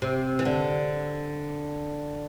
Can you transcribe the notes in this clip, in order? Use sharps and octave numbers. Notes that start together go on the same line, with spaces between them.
C3
E3
D3